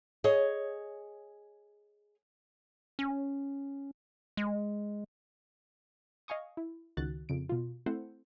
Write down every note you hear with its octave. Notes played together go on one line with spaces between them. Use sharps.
G#4 C#5 D#5
C#4
G#3
D#5 F5 G#5 C#6 D#6
E4
C#2 D#3 F#4 F#6 A6
F2 C#3 D7
B2 F4
A3 C4 E4 A4 C5 F#5